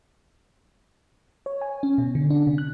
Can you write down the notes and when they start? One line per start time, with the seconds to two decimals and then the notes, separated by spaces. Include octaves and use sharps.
1.46 C#5
1.61 G#5
1.83 C#4
1.98 B2
2.15 D3
2.30 D4
2.47 C3
2.58 F#6